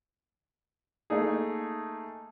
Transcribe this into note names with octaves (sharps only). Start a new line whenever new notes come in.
A3 A#3 D#4 G#4